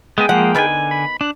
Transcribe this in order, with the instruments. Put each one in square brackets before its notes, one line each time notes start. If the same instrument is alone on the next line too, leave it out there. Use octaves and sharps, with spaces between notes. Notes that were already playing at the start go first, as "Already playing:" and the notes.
[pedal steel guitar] G#3 B3 D#5 [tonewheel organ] G#4 G5
[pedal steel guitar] F3 G#3 A#3 [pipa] F#5
[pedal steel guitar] D3 G#5 [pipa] D#3 B3 B4
[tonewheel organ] B5
[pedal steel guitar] D4 [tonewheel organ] F#6